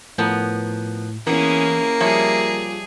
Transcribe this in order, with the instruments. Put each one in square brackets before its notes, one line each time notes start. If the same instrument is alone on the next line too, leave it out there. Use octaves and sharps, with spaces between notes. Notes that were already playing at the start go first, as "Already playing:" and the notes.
[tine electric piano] A2 [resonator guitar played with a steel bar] F3 B3 A#4
[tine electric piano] E3 [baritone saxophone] A#3 [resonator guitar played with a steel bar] B3 [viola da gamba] C#4 E4 G#4
[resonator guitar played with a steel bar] F3 C#5 E5 [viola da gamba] G3 G#4 [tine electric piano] F4